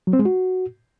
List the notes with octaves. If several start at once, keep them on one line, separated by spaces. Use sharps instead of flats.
F#3
C4
G#3
F#4